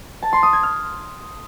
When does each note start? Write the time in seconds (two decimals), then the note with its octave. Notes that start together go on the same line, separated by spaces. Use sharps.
0.23 A5
0.33 C6
0.43 D#6
0.53 G#6
0.63 F6